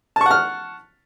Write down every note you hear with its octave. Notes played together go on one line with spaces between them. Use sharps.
F#5 A5 C#6 F6